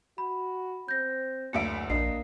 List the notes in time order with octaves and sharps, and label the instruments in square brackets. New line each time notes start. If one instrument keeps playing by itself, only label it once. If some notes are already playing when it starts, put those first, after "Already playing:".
[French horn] F#4 [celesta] B5
[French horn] C4 [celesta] G6 A#6
[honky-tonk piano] F#1 D2 E5 [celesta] C#7 D7
[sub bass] A#1 [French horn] A#3 [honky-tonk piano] D4 D#5 [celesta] C7